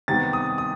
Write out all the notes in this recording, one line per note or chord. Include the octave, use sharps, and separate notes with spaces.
C3 D#3 G3 B3 A6
D#6
D#6